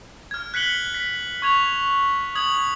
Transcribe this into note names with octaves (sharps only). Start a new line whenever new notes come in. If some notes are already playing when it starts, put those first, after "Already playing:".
F6 G#6
F#6 B6 C#7 F#7 G7
B6
C#6 G#6 F7
D#6 G#6 F#7